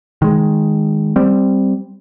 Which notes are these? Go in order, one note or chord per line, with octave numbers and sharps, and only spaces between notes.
D#3 G#3
G3 C4